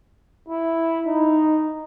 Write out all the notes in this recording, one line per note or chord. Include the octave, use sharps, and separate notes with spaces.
E4
D#4